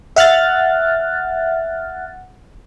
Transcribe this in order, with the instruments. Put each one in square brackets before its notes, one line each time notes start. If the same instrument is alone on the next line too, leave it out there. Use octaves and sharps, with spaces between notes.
[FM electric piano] E5 F#5 F6 F#6 A6